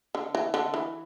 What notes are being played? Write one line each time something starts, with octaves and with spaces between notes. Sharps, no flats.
D3
E3
D3
E3